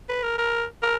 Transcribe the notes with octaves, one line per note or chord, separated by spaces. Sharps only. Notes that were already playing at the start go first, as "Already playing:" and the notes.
B4
A#4
A#4
A#4